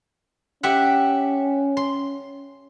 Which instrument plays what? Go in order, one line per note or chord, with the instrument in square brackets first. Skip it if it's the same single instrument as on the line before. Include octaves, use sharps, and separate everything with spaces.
[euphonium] C#4 [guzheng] G4 E5 F#5
[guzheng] C6